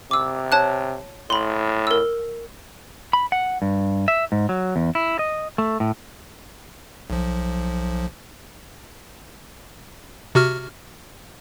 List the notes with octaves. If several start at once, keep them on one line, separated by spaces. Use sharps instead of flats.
C3 D6 E6
C#5 A5 F#6
A2 B5 C6
A#4 E6
B5
F#5
G2
E5
G#2
F#3
E2
E4
D#5
A3
A2
B1 F3
C3 F#4 F6